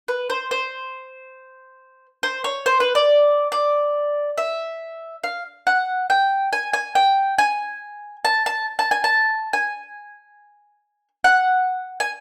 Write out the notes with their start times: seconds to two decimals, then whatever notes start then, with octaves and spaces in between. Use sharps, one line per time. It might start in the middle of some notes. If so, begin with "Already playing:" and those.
0.08 B4
0.30 C5
0.51 C5
2.23 C5
2.44 C#5
2.66 C5
2.80 B4
2.95 D5
3.52 D5
4.38 E5
5.24 F5
5.67 F#5
6.10 G5
6.53 G#5
6.73 G#5
6.95 G5
7.38 G#5
8.25 A5
8.46 A5
8.79 A5
8.91 G#5
9.04 A5
9.53 G#5
11.24 F#5
12.00 G#5